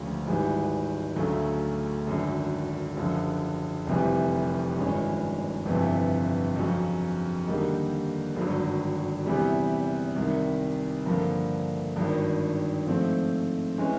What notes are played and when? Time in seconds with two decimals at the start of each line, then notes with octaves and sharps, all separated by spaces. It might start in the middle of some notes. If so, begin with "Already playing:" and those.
Already playing: E1 D2 C#3 F3
0.26 G#1 G#2 E3 G3
1.16 D2 C#3 F#3 A3
2.07 G#1 F#2 D3
2.96 F#1 F#2 D3 F3
3.87 F1 F2 C3 E3 G3
4.77 G#1 G2 E3 G#3 C#4
5.66 G1 F2 C3 E3
6.56 F2 C#3 F#3
7.47 D#2 D3 G3 A#3 D#4
8.36 G#1 G2 D3 F#3
9.26 E2 C3 E3 G3
10.16 C2 C3 D#3
11.06 G2 D3 F3 A#3
11.96 G#1 G2 D#3
12.86 G#2 F3 A3 C4
13.78 E3 G#3 C#4